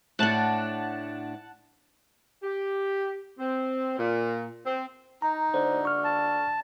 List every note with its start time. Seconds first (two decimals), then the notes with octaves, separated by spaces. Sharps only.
0.19 A2 D4 F#5 A5 F#6
2.43 G4
3.38 C4
3.97 A#2
4.65 C4
5.22 D#4 A#5
5.54 D3 C5
5.85 C#6 F6
6.04 A5